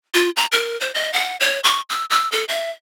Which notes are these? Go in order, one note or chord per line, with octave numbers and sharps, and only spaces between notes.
F4
A#5
A#4
C5
D#5
F#5
C#5
C#6
E6
E6
A4
E5